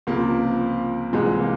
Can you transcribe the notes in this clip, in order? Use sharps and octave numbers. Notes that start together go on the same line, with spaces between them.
C#2 C3 F3 A#3
C2 C3 E3 G#3
A#3